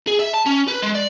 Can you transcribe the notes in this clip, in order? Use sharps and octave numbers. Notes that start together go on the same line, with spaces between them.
G#4
E5
A5
C#4
B4
G#3
D5